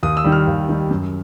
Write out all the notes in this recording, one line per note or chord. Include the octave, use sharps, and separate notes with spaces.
D#2 D#6
E6
D#3 G3
F6
D#2
D#3 G3
F#2